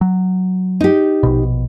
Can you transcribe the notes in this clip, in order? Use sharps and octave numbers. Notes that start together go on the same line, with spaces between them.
F#3
D#4 G4
A#1 B2